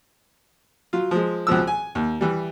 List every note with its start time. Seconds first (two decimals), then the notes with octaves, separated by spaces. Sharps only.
0.93 F#3 F4
1.11 F3 G#3
1.47 C#2 B2 F3 E6
1.67 G#5
1.95 D#2
2.21 E3 G3